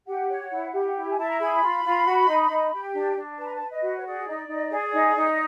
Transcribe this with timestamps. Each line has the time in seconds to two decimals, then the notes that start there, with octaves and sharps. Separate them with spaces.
0.06 G4 F#5
0.28 C#5
0.51 E4
0.73 G4
0.96 E4
1.10 G#5
1.17 E4 A5
1.29 A#5
1.40 G#4 B5
1.62 F4
1.84 F4
2.06 F#4
2.28 D#4
2.50 D#4
2.72 G4
2.94 D4
3.16 D4
3.38 B4 A5
3.46 A#5
3.54 A5
3.60 B4
3.72 D#5
3.82 F#4
3.97 C#5
4.05 G#4 D5
4.27 D#4
4.48 D#4
4.71 G#4
4.93 D#4
5.15 D#4